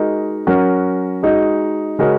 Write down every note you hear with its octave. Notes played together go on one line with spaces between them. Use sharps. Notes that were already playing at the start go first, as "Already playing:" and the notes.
Already playing: G#3 D#4 F#4 A#4
F#3 C#4 F#4 A#4
G#3 D#4 F#4
C#3 G#3 C#4 F#4 A#4